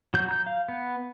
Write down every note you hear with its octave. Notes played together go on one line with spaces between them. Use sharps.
F#3 G6
A#5 G6
F5
B3